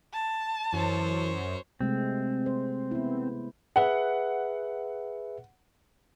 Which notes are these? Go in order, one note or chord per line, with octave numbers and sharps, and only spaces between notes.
A5
F#2 E3 C5 C#5
C3 G#3 A3 C4
C5
B3 E4
G#4 B4 E5 F#5